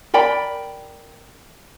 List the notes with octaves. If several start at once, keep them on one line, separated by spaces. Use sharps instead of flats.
A#4 D5 G5 B5